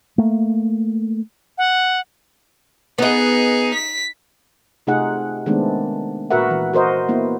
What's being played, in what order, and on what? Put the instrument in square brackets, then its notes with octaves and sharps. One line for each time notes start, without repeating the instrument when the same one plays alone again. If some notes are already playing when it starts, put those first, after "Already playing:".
[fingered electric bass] A3 A#3
[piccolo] F#5
[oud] B3 D#5 [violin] D#4 G#4
[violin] B6
[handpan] C3 A3 D#4 F4 G#4 F#5
D#3 G#3 A3 B3 C4 D4
A#2 F#4 A#4 B4 E5 F#5
E3
F#4 A#4 C5 D#5
A#3 B3 E4